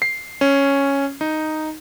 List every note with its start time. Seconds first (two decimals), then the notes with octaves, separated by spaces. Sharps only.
0.02 C7
0.41 C#4
1.21 D#4